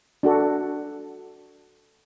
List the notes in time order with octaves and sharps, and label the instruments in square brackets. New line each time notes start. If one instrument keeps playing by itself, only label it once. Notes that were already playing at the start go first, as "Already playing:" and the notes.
[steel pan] D4 F#4 A4